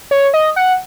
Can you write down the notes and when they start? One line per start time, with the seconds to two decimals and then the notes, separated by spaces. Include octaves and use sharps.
0.11 C#5
0.34 D#5
0.56 F#5